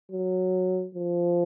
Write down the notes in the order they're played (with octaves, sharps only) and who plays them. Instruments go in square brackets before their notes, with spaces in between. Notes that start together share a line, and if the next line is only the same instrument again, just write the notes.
[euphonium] F#3
F3